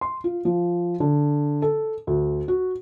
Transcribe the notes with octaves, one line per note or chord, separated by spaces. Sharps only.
C6
F4
F3
D3
A4
D2
F#4